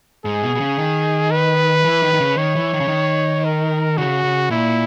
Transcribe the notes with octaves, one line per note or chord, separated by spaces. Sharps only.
G#2 G#4
B2
B2
C#3
D#3
B4
E3
D#3
D#3
C#3
D#3 C#5
E3
D#3
C#3
D#3
A#4
C#3 F#4
C#3
A#2 E4